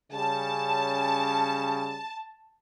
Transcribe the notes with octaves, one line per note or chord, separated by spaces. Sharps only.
C#3 G3 C#4 A5